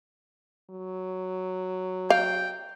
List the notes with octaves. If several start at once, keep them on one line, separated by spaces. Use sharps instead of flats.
F#3
F5 G5